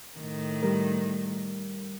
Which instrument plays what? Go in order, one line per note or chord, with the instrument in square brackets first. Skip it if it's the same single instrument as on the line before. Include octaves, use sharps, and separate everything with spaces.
[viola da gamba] A2 D#3
[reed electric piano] G3 A#4